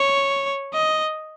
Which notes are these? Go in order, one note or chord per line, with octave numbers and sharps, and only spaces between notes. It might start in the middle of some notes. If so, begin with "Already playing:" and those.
Already playing: C#5
D#5